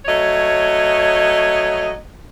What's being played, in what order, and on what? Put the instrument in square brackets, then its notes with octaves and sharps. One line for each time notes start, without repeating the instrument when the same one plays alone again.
[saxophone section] F#3 A3 C#5 D#5